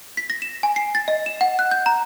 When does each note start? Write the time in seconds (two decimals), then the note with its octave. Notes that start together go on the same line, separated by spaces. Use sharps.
0.17 B6
0.30 A#6
0.42 E7
0.63 G#5
0.76 C7
0.95 A6
1.08 D#5
1.26 E7
1.41 F#5
1.59 F#6
1.71 G6
1.86 A#5